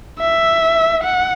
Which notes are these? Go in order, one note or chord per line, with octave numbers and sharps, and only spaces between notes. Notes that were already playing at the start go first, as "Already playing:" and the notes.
E5
F#5